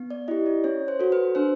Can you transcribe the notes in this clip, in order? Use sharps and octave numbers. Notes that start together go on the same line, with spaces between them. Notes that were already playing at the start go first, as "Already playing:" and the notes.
Already playing: B3
D5
E4 G4 D#5
D5
C#4 C#5
C5
F#4 A4
B4
D4 C5